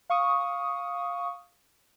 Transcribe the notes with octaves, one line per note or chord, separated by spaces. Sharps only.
F5 C#6 D#6